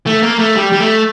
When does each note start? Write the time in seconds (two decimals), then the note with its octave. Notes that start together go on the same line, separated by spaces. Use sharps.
0.06 A3
0.22 A#3
0.39 A3
0.56 G3
0.72 G3
0.80 A3